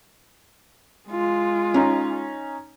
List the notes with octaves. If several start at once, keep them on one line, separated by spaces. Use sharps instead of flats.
G#3 F4
C#4 D#4